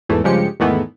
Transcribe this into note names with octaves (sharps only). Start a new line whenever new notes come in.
G#1 E2 E3 A3
G2 C#3 F3 G#3 G4 C#7
E2 G#2 D#3 E3 A3 B3